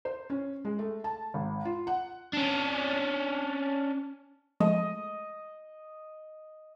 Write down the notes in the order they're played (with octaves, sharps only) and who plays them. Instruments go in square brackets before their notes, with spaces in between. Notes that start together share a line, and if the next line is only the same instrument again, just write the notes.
[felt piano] C5
C#4
G#3
A3
A5
G#1
F4
F#5
[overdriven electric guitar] C#4 D4
[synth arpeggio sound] F3 G#3 A3 [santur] D#5